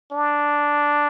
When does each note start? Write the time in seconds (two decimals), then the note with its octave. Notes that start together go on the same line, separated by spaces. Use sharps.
0.12 D4